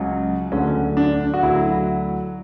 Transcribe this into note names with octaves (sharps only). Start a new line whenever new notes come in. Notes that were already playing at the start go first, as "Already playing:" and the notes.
Already playing: C#2 C#3 F#3
D2 D3 F#3 C#4
D4
F#4
D2 D3 F#3 E4